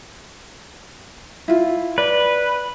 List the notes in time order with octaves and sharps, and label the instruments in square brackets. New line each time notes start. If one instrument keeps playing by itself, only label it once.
[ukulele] E4 F4
[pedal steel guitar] B4 [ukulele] D5